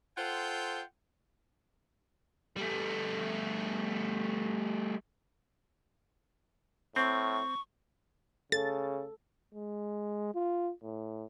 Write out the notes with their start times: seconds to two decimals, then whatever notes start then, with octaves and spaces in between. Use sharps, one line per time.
0.18 F4 A4 C5 F#5 G5
2.57 G3 A3
6.96 A2 C4 C#6
8.52 C#3 A4 A6
9.54 G#3
10.34 F4
10.83 A2